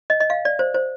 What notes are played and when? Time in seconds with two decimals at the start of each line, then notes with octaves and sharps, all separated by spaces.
0.10 D#5
0.20 D#5
0.30 F5
0.45 D5
0.59 C5
0.74 C5